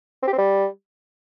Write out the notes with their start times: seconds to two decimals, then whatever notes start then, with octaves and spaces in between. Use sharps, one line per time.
0.22 C4
0.28 G4
0.33 C4
0.38 G3